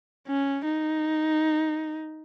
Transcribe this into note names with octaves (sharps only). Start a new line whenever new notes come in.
C#4
D#4